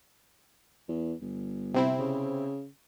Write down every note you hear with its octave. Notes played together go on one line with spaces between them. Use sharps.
E2
G1
C3 C4 E4
C#3